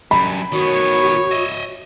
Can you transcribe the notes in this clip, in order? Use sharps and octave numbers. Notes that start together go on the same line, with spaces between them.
F#2 G3 B5
D#3 B3 F#4 C#5
D#5 E5